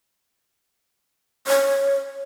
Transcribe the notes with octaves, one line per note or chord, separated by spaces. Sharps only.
C#5